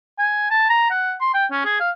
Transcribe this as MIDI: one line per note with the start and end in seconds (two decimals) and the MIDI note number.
0.19 0.49 80
0.51 0.69 81
0.70 0.89 82
0.91 1.15 78
1.21 1.34 84
1.34 1.45 79
1.52 1.63 61
1.65 1.77 68
1.80 1.90 77